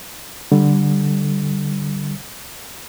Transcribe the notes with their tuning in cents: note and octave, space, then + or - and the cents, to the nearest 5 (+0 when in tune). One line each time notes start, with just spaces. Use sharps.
D3 +0 G3 -15